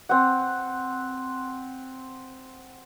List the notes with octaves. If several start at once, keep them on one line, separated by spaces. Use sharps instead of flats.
C4 F#5